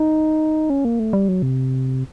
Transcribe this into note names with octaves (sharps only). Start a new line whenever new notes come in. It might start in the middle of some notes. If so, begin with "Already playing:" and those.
Already playing: D#4
C#4
A#3
A3
G3
F#3
C3